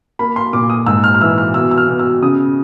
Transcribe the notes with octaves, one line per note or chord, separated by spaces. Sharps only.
A#3 B5
C6
A#2 D6
D#6
G#2 E6
F6
F6
E3 E6
F6
B2 E6
E6
F6
B2
E6
C#3 D#6